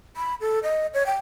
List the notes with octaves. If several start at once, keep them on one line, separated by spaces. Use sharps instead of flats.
B5
A4
D#5
C#5
G5